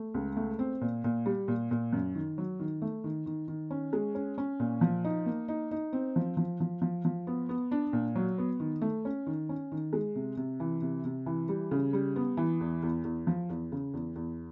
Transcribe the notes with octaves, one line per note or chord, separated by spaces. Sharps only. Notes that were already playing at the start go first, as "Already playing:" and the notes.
Already playing: A3
C#2
A3
C4
A#2
A#2
G3
A#2
A#2
F#2
D#3
F#3
D#3
A3
D#3
D#3
D#3
C#4
G#3
C#4
C#4
A#2
F3
D#4
A#3
D#4
D#4
C4
F3
F3
F3
F3
F3
B3
B3
D4
A#2
F#3
B3
D#3
A3
C#4
D#3
C#4
D#3
G#3
C3
C3
E3
C3
C3
E3
G3
C#3
G3
B3
E3
E2
E2
E2
F3
E2
C#3
E2
E2